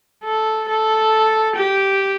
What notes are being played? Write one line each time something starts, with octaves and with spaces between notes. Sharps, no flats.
A4
A4
G4